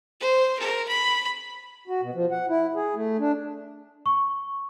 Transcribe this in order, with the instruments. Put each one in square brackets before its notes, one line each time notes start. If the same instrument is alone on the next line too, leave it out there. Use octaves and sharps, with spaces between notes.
[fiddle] C5
A#4
B5
[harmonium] F#4
B2
F3
F#5
E4
G#4
A3
D4
[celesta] C#6